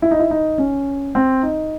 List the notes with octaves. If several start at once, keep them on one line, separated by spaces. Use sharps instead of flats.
E4
D#4
E4
D#4
C#4
C4
D#4